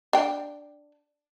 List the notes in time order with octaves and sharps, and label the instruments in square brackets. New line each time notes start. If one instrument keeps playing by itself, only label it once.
[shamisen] D4 G5